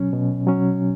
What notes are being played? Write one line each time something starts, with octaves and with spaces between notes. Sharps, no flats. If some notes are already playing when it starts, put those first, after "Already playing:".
Already playing: B2 F#3 C#4
B2
F#3 C#4